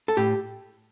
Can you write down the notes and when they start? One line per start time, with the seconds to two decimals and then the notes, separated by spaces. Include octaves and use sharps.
0.08 A4
0.17 A2 G4